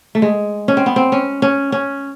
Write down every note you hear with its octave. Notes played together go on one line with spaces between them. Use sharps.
A3
G#3
C#4
C4
B3
C4
C#4
C#4
C#4